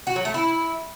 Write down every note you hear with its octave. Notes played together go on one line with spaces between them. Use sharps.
F#4
F#3
A3
E4